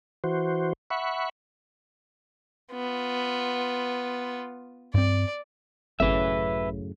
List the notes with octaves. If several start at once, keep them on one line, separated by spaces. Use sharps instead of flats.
E3 F#4 C5
E5 F#5 B5 C#6
B3 F4
G2 C4 D5
G#1 F#2 A2 C#3 B4 E5